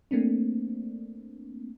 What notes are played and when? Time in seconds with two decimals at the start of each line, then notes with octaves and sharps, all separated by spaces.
0.11 A3 A#3 C4 D4